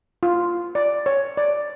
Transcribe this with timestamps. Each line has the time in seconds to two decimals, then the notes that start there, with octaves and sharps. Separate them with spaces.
0.23 F4
0.75 D5
1.06 C#5
1.37 D5